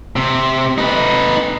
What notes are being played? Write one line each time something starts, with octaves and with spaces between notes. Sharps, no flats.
C3
D#4 B4